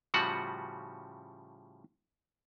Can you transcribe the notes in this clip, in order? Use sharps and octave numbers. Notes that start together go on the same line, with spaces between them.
A2 C#3 F3 G3 F#4 F#5